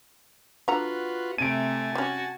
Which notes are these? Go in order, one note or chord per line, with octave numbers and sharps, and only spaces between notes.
D3 F4 F#4 B4 F#5 A#5
C3 A3 G#5 A5 D7 D#7
G3 C#4 F#4